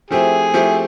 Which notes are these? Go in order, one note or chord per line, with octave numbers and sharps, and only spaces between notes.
F3 A3 C4 E4 G4 G#4
F3 A3 C4 E4 G4